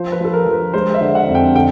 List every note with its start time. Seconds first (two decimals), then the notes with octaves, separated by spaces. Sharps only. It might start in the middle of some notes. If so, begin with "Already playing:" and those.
Already playing: F3 C5
0.12 B4
0.20 F3 A4
0.33 A#4
0.47 F3
0.53 B4
0.74 G#3 C5
0.94 E5
1.01 D3
1.15 F#5
1.28 F2
1.35 G5
1.55 D3 G5